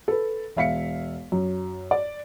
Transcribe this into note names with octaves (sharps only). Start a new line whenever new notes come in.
A4 B4
E1 E5 F5 B6 C#7
F#2
D5